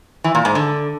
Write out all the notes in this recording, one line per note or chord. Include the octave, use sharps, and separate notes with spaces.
E3
A#2
G#2
D3